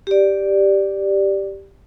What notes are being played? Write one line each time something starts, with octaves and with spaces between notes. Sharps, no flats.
G4 D5